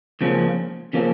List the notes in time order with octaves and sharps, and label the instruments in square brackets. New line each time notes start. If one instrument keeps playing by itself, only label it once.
[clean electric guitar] C#2 C#3 F3 A#3 C#4
C#3 F3 A#3 C#4